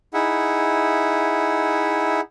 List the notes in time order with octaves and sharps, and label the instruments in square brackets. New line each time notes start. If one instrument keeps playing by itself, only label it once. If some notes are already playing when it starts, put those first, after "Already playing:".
[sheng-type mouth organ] D#4 E4 G#4 E5 F#5